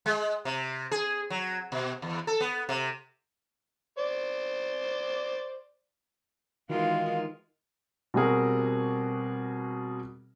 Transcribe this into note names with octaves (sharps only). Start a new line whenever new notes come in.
G#3
C3
G#4
F#3
B2
E2
A4
B3
C3
C5 D5
D#3 E3 G#3 F4 F#4 F5
B2 G3 C4 F#4 G#4 A#4